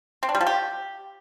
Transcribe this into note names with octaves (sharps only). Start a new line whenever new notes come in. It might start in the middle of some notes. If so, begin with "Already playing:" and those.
C4
D4
G3
F3
G4